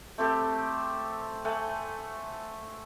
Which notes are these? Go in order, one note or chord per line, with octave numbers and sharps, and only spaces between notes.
A3 C4 G4 A4
A3 F#5 G#5